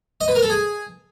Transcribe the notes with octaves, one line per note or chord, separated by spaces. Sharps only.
D#5
B4
A#4
A4
G#4